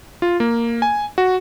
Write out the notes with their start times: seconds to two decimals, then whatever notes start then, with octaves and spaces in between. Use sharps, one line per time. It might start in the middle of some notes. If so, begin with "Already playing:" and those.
0.22 F4
0.40 A#3
0.82 G#5
1.18 F#4